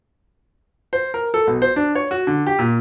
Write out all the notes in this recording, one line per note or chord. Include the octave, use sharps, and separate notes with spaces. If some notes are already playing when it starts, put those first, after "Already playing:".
C5
A#4
A4
B1
C5
D4
C#5
F#4
D3
G4
A#2